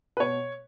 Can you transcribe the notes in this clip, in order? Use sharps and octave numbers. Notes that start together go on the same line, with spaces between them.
B4
B2 C#5